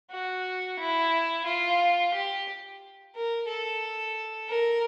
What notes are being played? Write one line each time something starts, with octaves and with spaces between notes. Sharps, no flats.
F#4
E4
F4
G4
A#4
A4
A#4